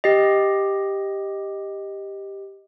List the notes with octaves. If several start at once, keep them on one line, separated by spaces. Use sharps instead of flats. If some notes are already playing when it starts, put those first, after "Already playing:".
G4 D#5